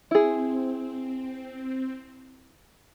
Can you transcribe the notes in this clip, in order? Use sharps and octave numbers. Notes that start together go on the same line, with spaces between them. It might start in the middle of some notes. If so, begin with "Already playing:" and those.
C4 E4 G#4